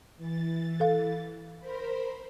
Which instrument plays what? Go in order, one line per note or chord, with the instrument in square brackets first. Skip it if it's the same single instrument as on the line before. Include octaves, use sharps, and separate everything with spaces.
[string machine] E3 A6
[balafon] A4 F5
[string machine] A#4 C5 B5